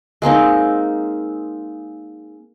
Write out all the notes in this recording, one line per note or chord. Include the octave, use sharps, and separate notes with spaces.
G#3 A#3 C4 D#4